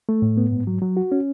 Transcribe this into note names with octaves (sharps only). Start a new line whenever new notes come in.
A3
A2
B3
G#2
F#3
F#3
F#4
C#4